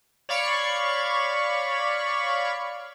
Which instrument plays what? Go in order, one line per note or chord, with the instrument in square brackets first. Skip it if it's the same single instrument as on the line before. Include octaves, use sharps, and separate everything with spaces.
[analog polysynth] C#5 D5 F5 B5 C#6